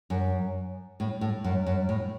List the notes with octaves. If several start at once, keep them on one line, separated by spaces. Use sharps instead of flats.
F#2
A2
A2
F#2
F#2
A2